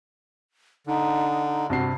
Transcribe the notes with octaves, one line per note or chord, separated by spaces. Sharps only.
D3 D#4
G2 C3 F#4 C7